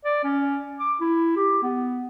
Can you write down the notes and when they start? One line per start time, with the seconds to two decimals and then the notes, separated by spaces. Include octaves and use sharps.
0.05 D5
0.24 C#4
0.80 D6
1.00 E4
1.36 G4
1.63 B3